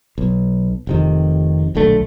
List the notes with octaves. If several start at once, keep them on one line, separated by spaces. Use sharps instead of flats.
B1
F1 C3 D#3
D#1 B1 D3 A3